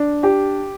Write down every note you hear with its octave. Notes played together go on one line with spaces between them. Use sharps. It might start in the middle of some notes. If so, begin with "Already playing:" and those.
Already playing: D4
G4